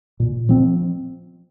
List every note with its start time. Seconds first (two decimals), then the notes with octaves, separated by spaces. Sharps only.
0.20 A#2
0.49 F3 C4